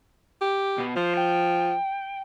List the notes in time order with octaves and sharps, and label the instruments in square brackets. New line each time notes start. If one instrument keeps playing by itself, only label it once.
[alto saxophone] G4
[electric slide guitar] B2 B3
[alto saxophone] F3 [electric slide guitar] C5
[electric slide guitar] G5